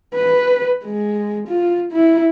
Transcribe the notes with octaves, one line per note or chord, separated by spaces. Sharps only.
B4
G#3
F4
E4